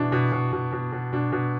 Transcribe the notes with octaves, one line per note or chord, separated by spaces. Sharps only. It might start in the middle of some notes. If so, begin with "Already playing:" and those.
Already playing: B2 E3 D4
B2
B2
B2
B2
B2
B2 D4
B2